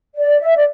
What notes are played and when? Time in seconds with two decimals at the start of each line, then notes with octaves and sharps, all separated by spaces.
0.16 D5
0.40 E5
0.56 D5